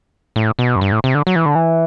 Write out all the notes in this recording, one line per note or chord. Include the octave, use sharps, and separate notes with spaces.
A2
B2
F#2
G2
A2
C3
D3
F#3
E3
D3
E3